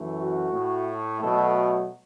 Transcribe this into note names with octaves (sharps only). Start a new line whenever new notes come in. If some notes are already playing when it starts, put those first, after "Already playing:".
Already playing: F#2 E3 A3
F#4
A2 A3
B2 F#3 A3 A4